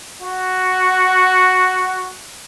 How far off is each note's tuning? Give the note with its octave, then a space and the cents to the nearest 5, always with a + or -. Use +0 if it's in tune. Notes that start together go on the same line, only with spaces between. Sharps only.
F#4 +0